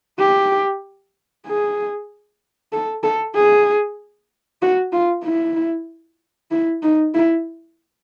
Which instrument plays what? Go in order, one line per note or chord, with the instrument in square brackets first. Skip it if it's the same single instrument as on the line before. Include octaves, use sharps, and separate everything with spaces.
[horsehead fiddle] G4
G#4
A4
A4
G#4
F#4
F4
E4
E4
D#4
E4